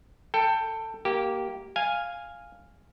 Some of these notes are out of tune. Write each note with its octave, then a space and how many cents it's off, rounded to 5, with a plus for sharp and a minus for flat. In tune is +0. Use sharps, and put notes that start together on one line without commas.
A4 +15 G5 +5
A#3 +0 G4 -15
F5 +0 G#5 -10